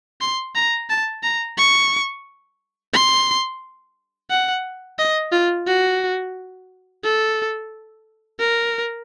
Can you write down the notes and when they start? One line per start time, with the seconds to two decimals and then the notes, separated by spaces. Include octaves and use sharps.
0.21 C6
0.55 A#5
0.90 A5
1.23 A#5
1.58 C#6
2.93 C6
4.31 F#5
4.98 D#5
5.32 F4
5.67 F#4
7.04 A4
8.40 A#4